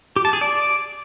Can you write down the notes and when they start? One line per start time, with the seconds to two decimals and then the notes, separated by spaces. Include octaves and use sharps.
0.16 G4
0.25 A5
0.33 G#4
0.41 D5